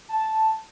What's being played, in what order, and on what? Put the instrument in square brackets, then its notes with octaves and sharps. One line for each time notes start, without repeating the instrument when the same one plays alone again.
[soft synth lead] A5